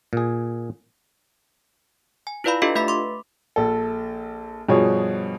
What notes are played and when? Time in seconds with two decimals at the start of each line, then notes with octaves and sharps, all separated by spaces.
0.13 A#2 G#4
2.27 G#5
2.44 E4 F4 B4 D5 F5 B5
2.62 D4 F4 G4 A4 D#5 F5
2.75 A3 B4 E5 B5 B6
2.88 C6 D6
3.56 A#1 A4
4.69 G2 B2 F3 G#4 C#5